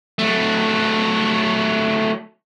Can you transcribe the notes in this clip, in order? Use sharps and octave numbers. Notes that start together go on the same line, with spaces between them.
F#3 A3